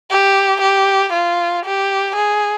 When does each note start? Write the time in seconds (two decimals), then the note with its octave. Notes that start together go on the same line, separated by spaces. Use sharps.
0.11 G4
0.62 G4
1.13 F4
1.66 G4
2.16 G#4